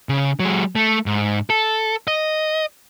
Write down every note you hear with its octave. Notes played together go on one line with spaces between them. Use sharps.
C#3
F#3 G#3
A3
G#2
A4
D#5